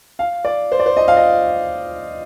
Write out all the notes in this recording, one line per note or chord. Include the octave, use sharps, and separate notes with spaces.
F5
D5
C5
D5
C5
D#5
F5
D#5